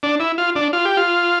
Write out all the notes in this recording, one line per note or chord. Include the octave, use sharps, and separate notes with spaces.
D4
E4
F4
D4
F4
G4
F4